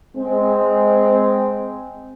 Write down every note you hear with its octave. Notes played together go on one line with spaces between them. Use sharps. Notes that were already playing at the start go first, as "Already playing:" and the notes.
G#3 C4